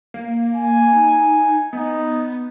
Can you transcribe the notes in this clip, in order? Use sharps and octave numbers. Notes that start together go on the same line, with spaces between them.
A#3
G#5
D#4
B3 D#4